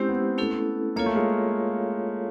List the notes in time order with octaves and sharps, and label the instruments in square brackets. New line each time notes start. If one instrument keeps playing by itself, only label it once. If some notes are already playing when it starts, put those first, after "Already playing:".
Already playing: [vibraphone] G#3 C#4 E4 G4 C5 [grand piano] C4
[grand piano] B3
[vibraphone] A3 C#4 E4 A4
[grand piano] A#3 [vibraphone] F4 A4 C#5 F5
[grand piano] A3
G#3